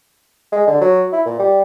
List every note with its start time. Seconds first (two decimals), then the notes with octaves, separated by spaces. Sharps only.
0.52 G#3
0.67 D3
0.81 F#3
1.12 E4
1.25 A#2
1.39 G3